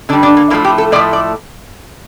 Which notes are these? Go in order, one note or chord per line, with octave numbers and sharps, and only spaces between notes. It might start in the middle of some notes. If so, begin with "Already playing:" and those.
D3 G3 D4
D4
A#3
A2 F3 A3 A#3
G4
A4
A2 F3 A3 D5
D5